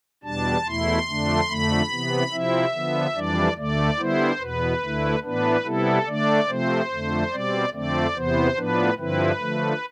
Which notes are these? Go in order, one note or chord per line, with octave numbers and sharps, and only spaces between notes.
E2 B2 G3 D4 A5
E2 B2 A3 E4 C6
F2 D3 A3 D4
F2 D3 A3 B5
C3 E3 B3
C3 F3 C4 E4 E5
D3 F3 B3
F2 E3 G3 D4 D5
D2 D3 A3 D5
D3 G3 B3 E4 C5
E2 B2 B3 B4
D2 D3 A3 E4
A2 E3 B3 D4 B4
C3 G3 B3 E4 A4
D3 A3 D4 D5
C3 F3 A3 C4 C5
F2 D3 A3
B2 G3 C4 D5
F2 D3 A3 C4 D5
E2 C3 E3 B3 C5
A2 F3 B3 D4 B4
G2 D3 F3 C4 E4 B4
D3 F3 A3